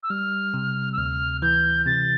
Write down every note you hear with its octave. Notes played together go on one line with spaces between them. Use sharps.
E6
G3 F6
C3
E6
D2 F6
E3 G6
C3 A6